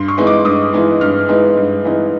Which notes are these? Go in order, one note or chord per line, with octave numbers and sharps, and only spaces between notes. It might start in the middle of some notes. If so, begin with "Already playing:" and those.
Already playing: G2 C6
C#6
E3 G#3 B3 D#4
D6
G2 D#6
E3 G#3 B3 D#4
G2 F6
E3 G#3 B3 D#4
G2
E3 G#3 B3 D#4